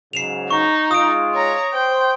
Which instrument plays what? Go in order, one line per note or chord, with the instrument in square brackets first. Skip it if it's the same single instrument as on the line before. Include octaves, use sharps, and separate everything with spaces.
[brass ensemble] G#2 C#3 F#3 [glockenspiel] C7 E7 F7
[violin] D#4 [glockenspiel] C#6
[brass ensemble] G#3 F4 [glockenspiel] D#6 D7
[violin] C#5 A#5
[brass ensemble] C5 [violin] G5